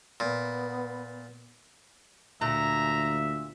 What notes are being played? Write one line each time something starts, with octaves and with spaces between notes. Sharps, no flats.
A#2 B3
D2 A#2 E5 A#5